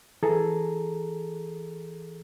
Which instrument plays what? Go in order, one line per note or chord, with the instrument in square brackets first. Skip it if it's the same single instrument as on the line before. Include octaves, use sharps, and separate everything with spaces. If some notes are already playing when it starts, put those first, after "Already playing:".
[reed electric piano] E3 G#4 A4 A#5